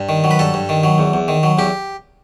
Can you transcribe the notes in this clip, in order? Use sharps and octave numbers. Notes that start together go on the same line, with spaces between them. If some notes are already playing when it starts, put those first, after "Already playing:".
Already playing: G2
D#3
F#3
B4
G2 A4
G2
D#3
F#3
E2
E2
D#3
F#3
E2 G4